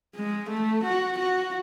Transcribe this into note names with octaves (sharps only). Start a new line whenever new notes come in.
G#3
A3
F#4
F#4